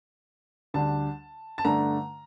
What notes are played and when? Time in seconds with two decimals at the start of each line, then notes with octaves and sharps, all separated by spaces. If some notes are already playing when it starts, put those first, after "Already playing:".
0.74 D2 D3 G3 D4 A5
1.58 A5
1.65 G2 D3 A3 D4 A#5